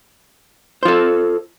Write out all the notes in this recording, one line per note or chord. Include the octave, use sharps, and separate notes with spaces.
F4 A4 C5